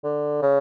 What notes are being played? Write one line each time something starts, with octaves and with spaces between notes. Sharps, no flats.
D3
C#3